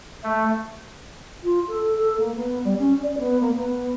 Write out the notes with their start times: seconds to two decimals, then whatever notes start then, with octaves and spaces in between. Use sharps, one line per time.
0.23 A3
1.43 F4
1.67 A4
1.97 A4
2.18 A#3
2.34 B3
2.64 G3
2.78 C#4
3.02 D5
3.18 B3
3.40 A#3
3.55 B3